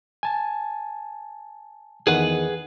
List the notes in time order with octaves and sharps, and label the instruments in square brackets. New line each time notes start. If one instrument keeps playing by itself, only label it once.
[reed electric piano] G#5 A5
[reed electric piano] E2 D#3 [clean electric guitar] G#4 B4 F#5